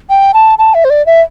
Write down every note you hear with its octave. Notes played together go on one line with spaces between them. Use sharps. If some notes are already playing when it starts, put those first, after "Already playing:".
G5
A5
A5
E5
C5
D5
E5